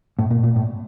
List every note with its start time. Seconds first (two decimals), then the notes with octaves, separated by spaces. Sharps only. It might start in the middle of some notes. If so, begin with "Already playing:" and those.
0.19 A2
0.31 A#2
0.43 A#2
0.56 A2